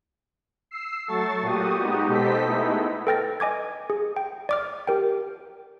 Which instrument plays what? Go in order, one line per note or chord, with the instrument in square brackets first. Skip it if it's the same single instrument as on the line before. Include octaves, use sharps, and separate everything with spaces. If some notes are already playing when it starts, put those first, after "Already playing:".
[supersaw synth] E6 C7
F#3 A3 A4 C#6 A6
A#2 F#4 G4 D#6
G#3 B3 D#4 F#4 G4
B2 G4 A4 C5 D#5 B6
G#3 A3 B3 D#4 E4
[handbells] A4 B4 G5 F6 A6 A#6
D#5 G#5 D6 G#6
G#4
G5
D5 D6 F6
G4 A#4 G5